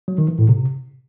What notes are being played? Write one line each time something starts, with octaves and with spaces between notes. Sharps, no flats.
F#3
D#3
E3
A2
C3